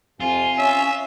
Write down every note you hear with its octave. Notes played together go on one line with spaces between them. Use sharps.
F2 C3 F4 G#5
C#4 E5